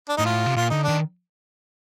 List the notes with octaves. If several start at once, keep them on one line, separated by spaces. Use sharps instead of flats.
D4
A2 D#4
F4
C3
A#2 F4
D3 D#4
D#3 D4